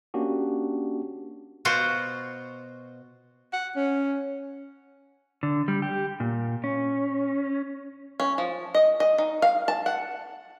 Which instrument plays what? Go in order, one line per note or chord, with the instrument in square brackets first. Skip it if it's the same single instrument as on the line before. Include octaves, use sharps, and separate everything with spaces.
[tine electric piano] A#3 C#4 D4 F#4 G4
[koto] B2 F4 F#4 C5
[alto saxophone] F#5
C#4
[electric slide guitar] D3
G3
G4
A#2
C#4
[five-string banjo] C#4
F3
D#5
D#5
D#4
F5
A5
F#5